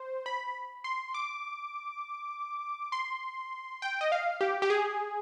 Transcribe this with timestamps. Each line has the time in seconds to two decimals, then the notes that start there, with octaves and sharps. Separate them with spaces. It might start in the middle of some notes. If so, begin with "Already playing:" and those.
Already playing: C5
0.26 B5
0.84 C6
1.14 D6
2.92 C6
3.82 G5
4.01 D#5
4.12 F5
4.41 G4
4.62 G4
4.70 G#4